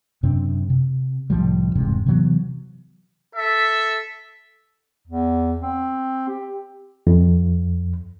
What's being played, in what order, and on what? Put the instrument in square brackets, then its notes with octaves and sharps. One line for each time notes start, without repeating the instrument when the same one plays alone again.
[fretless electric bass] F#2 C3 C4 D4
C3
C2 A2 F3 G3
E1 G#2 C3
C3 E3 F#3 B3
[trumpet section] A4 E5
[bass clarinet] E2
C4
G4
[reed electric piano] F2